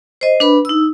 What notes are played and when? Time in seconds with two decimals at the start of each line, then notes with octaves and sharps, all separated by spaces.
0.21 C5 D#5
0.40 D4 B4 B5
0.65 D#4 E6